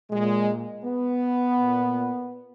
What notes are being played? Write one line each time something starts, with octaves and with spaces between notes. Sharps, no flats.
A#2 G#3
B3
A#2